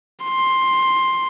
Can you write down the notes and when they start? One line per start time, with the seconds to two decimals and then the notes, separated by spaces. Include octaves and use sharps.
0.25 C6